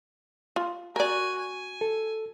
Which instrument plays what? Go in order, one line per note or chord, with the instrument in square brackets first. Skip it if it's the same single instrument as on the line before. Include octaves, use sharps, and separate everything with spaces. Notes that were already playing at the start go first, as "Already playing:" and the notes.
[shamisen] F4
[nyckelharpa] F#4 G#5 [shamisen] A#4 D5
[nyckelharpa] G#5
[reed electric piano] A4